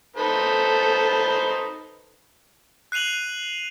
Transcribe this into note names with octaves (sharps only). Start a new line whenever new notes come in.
D#4 A4 B4 C5
F#6 C7 D#7 F7 F#7